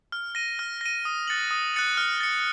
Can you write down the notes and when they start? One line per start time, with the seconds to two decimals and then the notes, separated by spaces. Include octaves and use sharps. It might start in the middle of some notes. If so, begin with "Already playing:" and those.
0.12 F6
0.35 A#6 D#7
0.59 F6
0.81 A#6 D#7
1.05 D#6
1.27 F#6 A6 C#7 F#7
1.51 D#6
1.74 F#6 A6 C#7 F#7
1.97 F6
2.21 A6 C#7